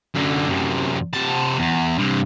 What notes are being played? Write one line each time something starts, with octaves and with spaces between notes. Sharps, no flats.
F#2 D3
F#2 C3
C3 A5
E2
G2 C3